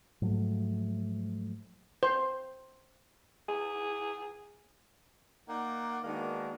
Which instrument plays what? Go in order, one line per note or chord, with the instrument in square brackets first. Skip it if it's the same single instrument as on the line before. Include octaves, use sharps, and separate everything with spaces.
[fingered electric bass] G#2 F3 F#3 A3
[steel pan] C5
[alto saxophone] G#4
[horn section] A#3 D#4 D5 F#5
D#3 G#3 A#3 B3 D4 F#4